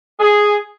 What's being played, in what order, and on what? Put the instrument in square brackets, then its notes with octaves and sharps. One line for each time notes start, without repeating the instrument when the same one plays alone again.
[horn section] G#4